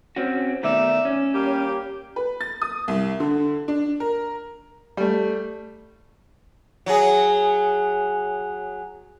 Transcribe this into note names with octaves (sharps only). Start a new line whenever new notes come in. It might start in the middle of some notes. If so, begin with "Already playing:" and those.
C4 C#4 F#4
B2 D#3 A3 D#4 D5 E5
C#4
G3 A#3 G4
B4
A6
D#6
C2
D3
D4
A#4
G3 A3
F#3 G#4